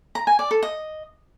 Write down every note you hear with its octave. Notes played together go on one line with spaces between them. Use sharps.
A#5
G#5
D5
A4
D#5